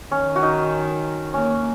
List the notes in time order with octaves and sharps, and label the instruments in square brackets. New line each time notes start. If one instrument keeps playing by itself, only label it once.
[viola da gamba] D#3 [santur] C#4
[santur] F#4
D#4
[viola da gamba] A#3 [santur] C#4